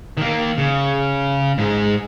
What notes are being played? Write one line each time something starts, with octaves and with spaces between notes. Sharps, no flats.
D#3 A#3
C#3
G#2 G#4